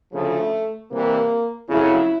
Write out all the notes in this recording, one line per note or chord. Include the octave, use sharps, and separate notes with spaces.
D2 C#3 F3 A3
C2 C3 E3 G3 A#3
F2 C#3 F#3 E4